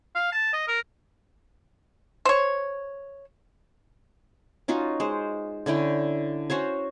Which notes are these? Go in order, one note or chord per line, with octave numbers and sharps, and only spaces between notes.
F5
A5
D#5
A#4
C5 C#5
C#4 D#4 F4 F#4
G#3 C5
D3 C#4 E4 G5
C#4 F#4 C5 C#5